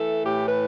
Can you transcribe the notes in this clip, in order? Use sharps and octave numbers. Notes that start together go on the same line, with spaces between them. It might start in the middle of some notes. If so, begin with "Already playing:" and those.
Already playing: E3 A3 A4
A2 G4
B4